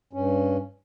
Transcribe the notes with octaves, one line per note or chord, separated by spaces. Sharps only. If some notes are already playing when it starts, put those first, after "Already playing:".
G2 C#4